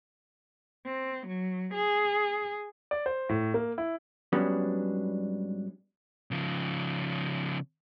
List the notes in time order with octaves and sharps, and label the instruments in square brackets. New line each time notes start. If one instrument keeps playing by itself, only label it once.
[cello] C4
F#3
G#4
[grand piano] D5
C5
A2
A#3
E4
[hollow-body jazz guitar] G#2 F#3 G3 B3 C#4 D4
[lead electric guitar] C#3 F3